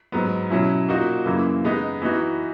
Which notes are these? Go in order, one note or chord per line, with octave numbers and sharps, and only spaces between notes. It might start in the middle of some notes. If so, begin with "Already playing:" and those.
G#2 F#3 B3
B2 F#3 C#4 E4
A#2 A#3 D#4 F#4
F#2 C#3 E3 A#3
C#3 G#3 B3 D#4
E3 B3 D#4 F#4